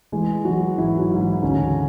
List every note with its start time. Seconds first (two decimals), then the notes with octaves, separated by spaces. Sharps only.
0.12 E3 G#3 G#4
0.45 E3 F#3 F#4
0.77 G#2 E3 E4
0.99 F#3 F#4
1.11 G#2
1.21 E3 E4
1.43 D2 C#3 C#4